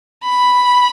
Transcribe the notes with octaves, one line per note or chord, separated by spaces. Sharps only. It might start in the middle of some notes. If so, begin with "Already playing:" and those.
B5